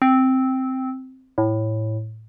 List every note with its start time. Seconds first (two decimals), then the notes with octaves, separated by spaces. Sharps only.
0.02 C4
1.38 A2